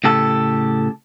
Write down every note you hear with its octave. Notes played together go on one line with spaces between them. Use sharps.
A2 C#3 G4 A4